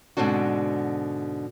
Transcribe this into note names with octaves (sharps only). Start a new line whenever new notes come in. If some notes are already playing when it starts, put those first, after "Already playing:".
G#2 B2 D3 C4 D4 F#4